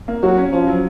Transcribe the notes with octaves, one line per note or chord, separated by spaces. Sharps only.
A#3
F#3 F#4
C#4
F3 C#4
F#3